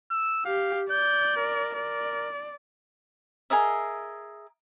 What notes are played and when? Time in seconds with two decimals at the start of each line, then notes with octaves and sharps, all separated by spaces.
0.11 E6
0.45 G4 F5
0.90 D5 G6
1.36 A#4
1.75 A#4 D5
3.50 G#4 A#4 D#5 E5